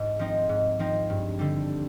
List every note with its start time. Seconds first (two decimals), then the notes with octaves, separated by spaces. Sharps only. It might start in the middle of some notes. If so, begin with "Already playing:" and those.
Already playing: G#2
0.19 F3 C4 D#4
0.49 G#2
0.79 F3 C4 D#4
1.10 G2
1.39 D3 G3